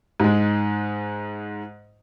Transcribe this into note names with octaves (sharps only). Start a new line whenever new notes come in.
G#2 G#3